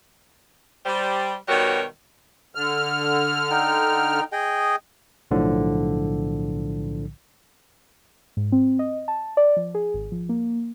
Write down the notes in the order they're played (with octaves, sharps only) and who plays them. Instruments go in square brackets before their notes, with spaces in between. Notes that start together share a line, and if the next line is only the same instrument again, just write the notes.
[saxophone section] G3 C5
B2 D#3 G3 F#4 A#4 C#5
[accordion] D3 F6
[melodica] D#4 G5
G#4 D#5 G5
[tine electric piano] B1 A2 D3 F3
[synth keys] G#2
C4
D#5
A5
D5
F3
G#4
G#1
F3
A#3